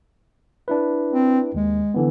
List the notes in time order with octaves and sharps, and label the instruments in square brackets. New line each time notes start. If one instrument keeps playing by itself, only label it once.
[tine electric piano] D4 E4 B4
[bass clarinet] C4
[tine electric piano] D#2 [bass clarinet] G#3
[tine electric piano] D3 E3 B3